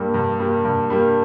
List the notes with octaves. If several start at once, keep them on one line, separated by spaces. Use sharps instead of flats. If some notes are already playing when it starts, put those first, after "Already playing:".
Already playing: G2 G3 A#3
G2
G3 A#3
G2
G3 A#3